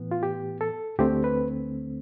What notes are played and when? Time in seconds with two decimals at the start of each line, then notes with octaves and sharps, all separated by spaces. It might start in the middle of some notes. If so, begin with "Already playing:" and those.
Already playing: A2 E3 B3
0.11 F4
0.23 G4
0.61 A4
0.99 D2 D3 A3 C4 G4
1.24 B4